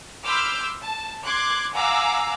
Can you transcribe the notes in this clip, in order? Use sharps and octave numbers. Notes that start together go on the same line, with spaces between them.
B5 C6 D6 E6 F6 G6
A5
C6 D6 F#6 G#6
F5 F#5 G#5 A#5 D6 E6